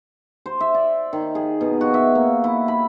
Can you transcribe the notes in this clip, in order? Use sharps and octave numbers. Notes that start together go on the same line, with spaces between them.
C5
E5
D5
D#3
G#4
B2
F#4
E5
A#3
E4
B5